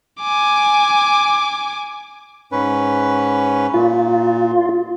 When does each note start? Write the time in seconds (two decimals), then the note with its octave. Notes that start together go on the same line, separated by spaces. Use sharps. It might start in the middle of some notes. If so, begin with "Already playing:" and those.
0.22 G#5 D6
2.52 G#2 C#4 B4
3.74 A#2 F4